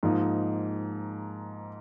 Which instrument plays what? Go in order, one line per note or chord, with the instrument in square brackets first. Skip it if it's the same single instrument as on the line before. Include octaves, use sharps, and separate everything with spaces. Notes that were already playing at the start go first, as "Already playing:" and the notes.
[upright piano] G#2 F3 A#3 D#4